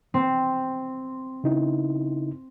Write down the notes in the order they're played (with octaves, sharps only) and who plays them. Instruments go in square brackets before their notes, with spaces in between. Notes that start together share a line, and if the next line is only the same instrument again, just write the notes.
[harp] C4
[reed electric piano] C#3 D#4 E4